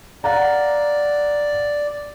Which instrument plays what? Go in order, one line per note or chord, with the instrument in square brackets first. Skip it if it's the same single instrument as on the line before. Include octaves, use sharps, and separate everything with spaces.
[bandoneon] D5 [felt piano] F5 F#5 A#5